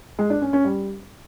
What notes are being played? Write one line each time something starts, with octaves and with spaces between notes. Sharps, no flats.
G#3
D4
C#4
C#4
G3